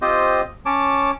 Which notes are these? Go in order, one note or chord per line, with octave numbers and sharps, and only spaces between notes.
C4 F4 G4 C5 D#5
C#4 C#5 A5 D6